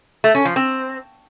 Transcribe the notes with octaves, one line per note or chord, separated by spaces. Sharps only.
A3
C#4
F3
C4